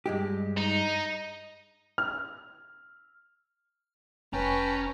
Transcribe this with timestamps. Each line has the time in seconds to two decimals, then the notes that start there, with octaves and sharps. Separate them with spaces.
0.06 G2 G#3 G4
0.57 D#4
1.98 F6
4.33 F1 C#4 B4 G5 A5 A#5